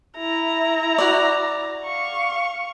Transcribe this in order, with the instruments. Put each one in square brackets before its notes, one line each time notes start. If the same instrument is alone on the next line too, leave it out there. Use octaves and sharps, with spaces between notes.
[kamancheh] E4 A#5
[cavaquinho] F#4 D5
[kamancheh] F5 C#6